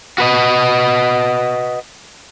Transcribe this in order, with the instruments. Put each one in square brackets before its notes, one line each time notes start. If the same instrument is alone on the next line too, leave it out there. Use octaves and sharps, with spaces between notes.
[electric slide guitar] F#4 B4 D#5